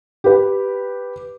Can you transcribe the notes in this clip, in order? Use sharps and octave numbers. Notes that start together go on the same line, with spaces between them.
G4 B4